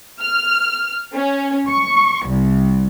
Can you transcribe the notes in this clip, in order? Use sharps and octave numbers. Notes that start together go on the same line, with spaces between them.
F6
C#4
C#6
C2